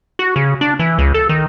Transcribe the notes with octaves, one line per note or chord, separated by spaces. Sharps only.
F#4
C#3
D4
E3
C#2
A4
D#3